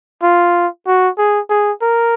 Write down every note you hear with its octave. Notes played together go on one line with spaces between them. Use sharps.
F4
F#4
G#4
G#4
A#4